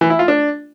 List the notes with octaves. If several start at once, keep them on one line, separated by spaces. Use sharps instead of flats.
E3
E4
F4
D4